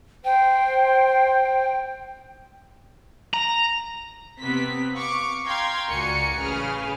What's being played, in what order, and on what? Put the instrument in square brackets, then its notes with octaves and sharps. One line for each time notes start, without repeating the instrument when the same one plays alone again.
[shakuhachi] C5 [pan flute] G5
[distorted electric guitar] A#5
[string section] C3 B3 C4 B6
F5 C#6 D6
F5 G5 A#5 C6 G#6
C#2 F#4 A#4 D5 G#5 C#7
A1 C#3 G#4 B4 F6